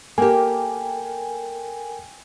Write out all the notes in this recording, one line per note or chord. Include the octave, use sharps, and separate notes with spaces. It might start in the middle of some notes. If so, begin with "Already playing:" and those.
A#3 G4 A4 A#4 G5 G#5